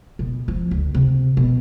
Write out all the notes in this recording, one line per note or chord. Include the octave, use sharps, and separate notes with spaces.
B2
F3
D2
C3
B2